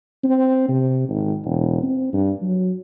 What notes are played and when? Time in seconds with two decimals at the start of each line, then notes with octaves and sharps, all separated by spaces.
0.24 C4
0.69 C3
1.09 G#1
1.44 E1
1.83 C4
2.13 G2
2.42 F#3